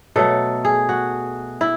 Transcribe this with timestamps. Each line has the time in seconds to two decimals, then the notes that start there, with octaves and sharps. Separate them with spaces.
0.16 B2 F#3 A3 A4
0.65 G#4
0.89 F#4
1.61 E4